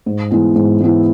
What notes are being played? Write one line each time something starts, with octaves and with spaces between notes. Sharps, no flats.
G#2
E3 G#3 B3 E4
G#2
E3 G#3 B3 E4